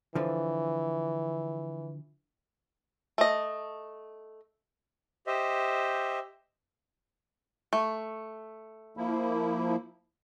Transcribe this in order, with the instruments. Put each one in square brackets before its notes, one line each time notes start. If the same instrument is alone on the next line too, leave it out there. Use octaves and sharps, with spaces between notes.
[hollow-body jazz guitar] D3 F3 [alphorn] E3
[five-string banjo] A3 D#5
[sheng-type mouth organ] G4 C5 D#5 E5
[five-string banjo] A3
[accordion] F3 A#3 E4